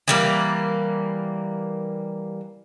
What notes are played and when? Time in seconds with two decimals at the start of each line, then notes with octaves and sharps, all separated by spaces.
0.08 E3 G3 A#3